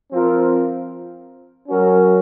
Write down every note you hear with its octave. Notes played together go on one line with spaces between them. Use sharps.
F3 C4 F4 A#4
F#3 C#4 F#4 A#4